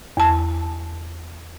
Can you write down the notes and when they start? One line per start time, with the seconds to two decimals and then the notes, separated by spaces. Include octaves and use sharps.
0.17 E2 A5